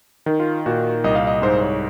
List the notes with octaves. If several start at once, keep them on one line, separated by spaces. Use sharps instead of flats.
D#3
F4
A#2 F#4
C2 D#5
F5
D#5
G#2 C5
C#5